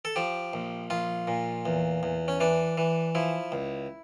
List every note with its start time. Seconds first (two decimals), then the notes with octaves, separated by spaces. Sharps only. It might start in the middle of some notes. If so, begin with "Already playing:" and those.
0.05 A4
0.16 F3 G4
0.53 A#1
0.90 A#1 F4
1.28 A#2
1.66 E2
2.03 E2
2.28 C#4
2.40 E3 D4
2.78 E3
3.15 F3 E4
3.52 C#2